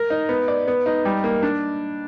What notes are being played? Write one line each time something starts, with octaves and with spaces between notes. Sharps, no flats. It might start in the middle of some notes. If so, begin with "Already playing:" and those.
Already playing: A#4
D#4
B3
D5
B3
D#4
G3
A#3
D4